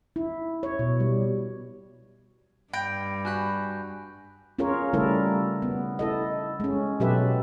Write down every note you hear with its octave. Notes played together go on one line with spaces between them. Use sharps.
E4
C#5
B2
G3
G2 G5 B5 A#6 D7
F#4 G#5 B5 F#6 G6
C#4 F4 G#4 A#4 C#5
C#3 G3 A3 E4 A4 A#4
B3
E4 A4 D#5
G#3 C#4
B2 F#3 G4 A4 B4 E5